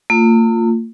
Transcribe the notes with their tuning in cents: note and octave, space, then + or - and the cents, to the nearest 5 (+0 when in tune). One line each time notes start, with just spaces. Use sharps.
A#3 -45 F4 +0